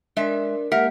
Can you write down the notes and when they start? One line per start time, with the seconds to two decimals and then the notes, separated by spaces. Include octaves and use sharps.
0.17 G#3 D4 A#4 D5 E5
0.72 G#3 A#3 G4 A#4 E5 F#5 B6